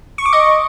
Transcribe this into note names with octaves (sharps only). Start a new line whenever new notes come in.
C#6
D6
D#5